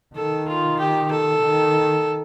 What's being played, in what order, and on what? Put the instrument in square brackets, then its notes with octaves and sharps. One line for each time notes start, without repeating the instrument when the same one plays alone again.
[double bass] D#3 [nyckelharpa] A4
[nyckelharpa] F4
G4
A4
[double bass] D#3